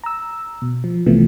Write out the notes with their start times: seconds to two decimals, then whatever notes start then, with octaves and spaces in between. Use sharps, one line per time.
0.04 A#5 E6
0.62 B2
0.84 F3
1.06 C2 C3 E3 F3 A3 B3